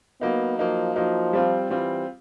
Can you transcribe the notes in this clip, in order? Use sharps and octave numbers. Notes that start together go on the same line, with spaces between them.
F#3 A#3 B3 D#4
F3 F#3 A#3 D#4
F3 F#3 A#3 D#4
G3 C4 F4
E3 G3 C4 F4